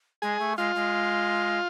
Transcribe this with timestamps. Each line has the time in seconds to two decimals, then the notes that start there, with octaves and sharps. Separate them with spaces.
0.22 G#3 G#4
0.40 A3
0.57 G#3 F4
0.75 G#3